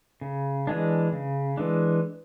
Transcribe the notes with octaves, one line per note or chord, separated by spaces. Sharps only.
C#3
E3 G#3 D4
C#3
E3 G#3 D4